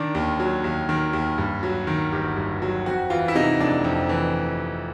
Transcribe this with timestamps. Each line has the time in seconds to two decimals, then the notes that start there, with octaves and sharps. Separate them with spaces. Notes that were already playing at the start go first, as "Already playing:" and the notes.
Already playing: D#3 D4
0.15 D#2
0.40 F#3
0.64 D#2
0.89 D#3
1.13 D#2
1.38 G2
1.63 F#3
1.87 D#3
2.12 G1 G4
2.36 G2
2.62 F#3
2.86 F2 F#4
3.10 E3 F4
3.28 E4
3.35 C3 D#4
3.60 F1 D4
3.84 F2
4.09 E3